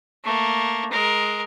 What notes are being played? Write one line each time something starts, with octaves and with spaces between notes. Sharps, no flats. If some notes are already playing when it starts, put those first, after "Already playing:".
A3 A#3
G#3 A#4